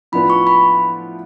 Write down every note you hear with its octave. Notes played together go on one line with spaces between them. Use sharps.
A2 F3 B3 D4 F4 B5
C#6
B5